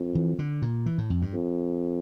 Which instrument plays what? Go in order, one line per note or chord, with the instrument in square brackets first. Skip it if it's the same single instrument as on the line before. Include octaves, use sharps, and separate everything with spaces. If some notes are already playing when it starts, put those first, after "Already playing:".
Already playing: [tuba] F2
[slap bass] E3
D3
A#2
E3
A2
F2
G2
[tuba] F2